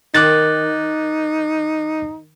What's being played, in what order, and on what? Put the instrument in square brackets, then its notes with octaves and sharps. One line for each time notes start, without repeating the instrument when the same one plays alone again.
[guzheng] D#3 [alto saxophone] D#4 [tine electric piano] D6 F#6 A6